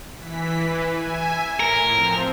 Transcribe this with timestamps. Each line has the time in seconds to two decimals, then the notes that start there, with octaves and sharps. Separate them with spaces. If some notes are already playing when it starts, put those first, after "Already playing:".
0.18 E3 B6
0.59 E3 B4
0.93 E5 G#5
1.60 A2 A#4 C#7
1.91 F3 C4